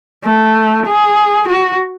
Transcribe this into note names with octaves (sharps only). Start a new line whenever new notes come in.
A3
G#4
F#4